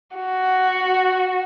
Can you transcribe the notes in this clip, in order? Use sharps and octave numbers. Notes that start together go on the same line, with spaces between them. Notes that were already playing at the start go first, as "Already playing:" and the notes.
F#4